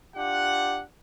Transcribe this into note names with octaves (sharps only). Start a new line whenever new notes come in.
D4 F4 G4 F#5